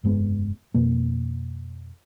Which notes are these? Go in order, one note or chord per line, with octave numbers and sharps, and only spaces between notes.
F1 G2 G#3 B3
F2 B2 A#3